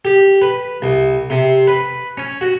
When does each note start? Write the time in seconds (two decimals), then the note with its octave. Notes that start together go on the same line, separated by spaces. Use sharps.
0.05 G4
0.42 B4
0.82 C2
1.30 C3
1.68 B4
2.17 C#4
2.41 F#4